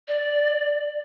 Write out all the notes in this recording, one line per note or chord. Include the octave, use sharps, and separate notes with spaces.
D5